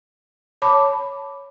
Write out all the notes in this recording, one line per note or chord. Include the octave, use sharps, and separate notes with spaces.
C#5 A5 B5 D6